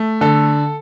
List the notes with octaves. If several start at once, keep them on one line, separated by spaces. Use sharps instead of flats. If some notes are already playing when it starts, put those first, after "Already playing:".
Already playing: A3
D3 A4